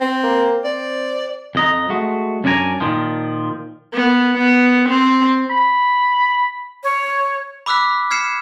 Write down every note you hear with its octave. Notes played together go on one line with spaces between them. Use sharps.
C4
A#3
C4 D5
F2 D#5 A#5
G#3 A3 F#4
F#2 C#4 D4 D5 G#5 A#5
A#2 D#3 F3
B3
B3
C4
B5
C#5
B5 D6 E6 F#6 B6
F6 G#6 C7 C#7 E7